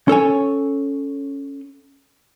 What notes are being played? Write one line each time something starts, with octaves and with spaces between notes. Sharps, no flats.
C#4 A4 C#5 G#5